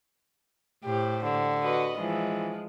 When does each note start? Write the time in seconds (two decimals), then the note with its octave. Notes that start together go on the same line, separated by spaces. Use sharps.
0.85 A2 G4 C5
1.23 D3
1.61 F#4 B4 D#5
1.99 E3 F3 G#3